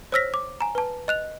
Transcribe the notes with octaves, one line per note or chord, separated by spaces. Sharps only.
C5 C#5 E6 F6 A#6 B6
D6
G#5 A#5
B4 A5
D#5 F#6 F7